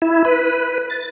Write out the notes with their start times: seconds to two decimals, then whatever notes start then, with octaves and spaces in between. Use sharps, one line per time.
0.02 E4
0.25 B4
0.90 A6